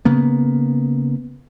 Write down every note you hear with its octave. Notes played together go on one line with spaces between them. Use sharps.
C#3 A#3 B3